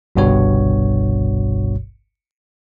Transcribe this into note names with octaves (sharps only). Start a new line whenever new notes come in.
G1 C2 G2 B2 F#4 C#5